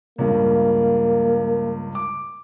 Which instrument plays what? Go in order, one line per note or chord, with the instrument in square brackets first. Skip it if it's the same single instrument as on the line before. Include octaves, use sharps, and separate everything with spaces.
[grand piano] C#2 G2 [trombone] A#3
[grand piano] D6